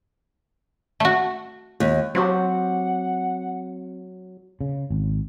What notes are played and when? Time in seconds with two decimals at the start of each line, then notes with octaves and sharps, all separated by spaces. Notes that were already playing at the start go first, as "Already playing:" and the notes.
1.00 A3 F#4
1.80 D#2
2.15 F#3 C4 F#4 G4 F#5
4.61 C#3
4.90 G#1